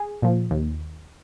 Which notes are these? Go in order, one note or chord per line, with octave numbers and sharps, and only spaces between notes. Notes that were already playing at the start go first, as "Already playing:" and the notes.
Already playing: G#4
A#2 F3
D#2